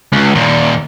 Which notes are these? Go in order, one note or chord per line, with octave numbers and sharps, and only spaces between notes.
C#2
D#2 A#2